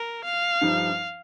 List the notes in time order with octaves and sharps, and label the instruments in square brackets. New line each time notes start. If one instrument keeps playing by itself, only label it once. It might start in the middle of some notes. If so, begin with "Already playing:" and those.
Already playing: [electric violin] A#4
F5
[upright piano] G2 F3 D#4